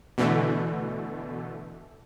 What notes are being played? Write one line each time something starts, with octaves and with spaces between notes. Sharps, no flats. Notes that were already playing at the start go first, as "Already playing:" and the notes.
B2 D3 E3 A3